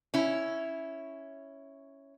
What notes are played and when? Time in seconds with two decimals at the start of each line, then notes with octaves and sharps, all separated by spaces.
0.14 C#4 E4